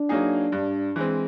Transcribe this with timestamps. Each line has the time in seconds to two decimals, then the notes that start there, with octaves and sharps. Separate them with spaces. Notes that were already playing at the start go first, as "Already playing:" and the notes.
Already playing: D4
0.09 F#3 A#3 D#4 G#4
0.52 G2
0.96 E3 G#3 C4